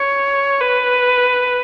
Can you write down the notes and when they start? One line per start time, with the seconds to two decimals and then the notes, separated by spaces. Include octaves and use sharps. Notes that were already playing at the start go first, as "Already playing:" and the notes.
Already playing: C#5
0.60 B4